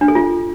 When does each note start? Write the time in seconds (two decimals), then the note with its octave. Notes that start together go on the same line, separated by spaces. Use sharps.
0.01 D4
0.08 A4
0.15 F4